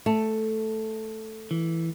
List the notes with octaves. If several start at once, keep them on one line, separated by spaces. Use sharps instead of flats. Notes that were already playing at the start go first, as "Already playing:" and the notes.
A3
E3